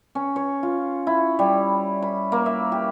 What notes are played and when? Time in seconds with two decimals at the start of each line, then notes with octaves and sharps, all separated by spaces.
0.15 C#4
0.36 C#5
0.63 F4
1.07 E4
1.39 G3
2.02 B5
2.32 A#3
2.46 E5
2.72 G4